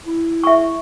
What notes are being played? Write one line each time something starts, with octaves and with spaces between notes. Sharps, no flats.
E4
E5 C#6